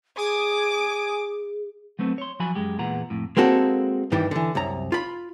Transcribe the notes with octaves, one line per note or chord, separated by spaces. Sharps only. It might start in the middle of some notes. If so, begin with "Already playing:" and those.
G#4 G#5 D6 D#6
F#3 A3 B3 C4
C#5 C6
F3 F#3 F#4 G#5 B5
F#2 G#3 G4
E2 A#2 B3 G#4 F#5 A#5
F2 A2
G#3 A#3 C4 F#4 A4
G2 D#3 E3 G3
D3 E3
C2 F#2 A#5
F4 B5